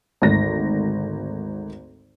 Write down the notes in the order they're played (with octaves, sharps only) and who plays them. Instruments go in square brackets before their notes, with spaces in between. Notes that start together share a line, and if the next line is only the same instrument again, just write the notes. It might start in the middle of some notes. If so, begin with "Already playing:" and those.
[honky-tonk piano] G#1 D2 D#3 A#6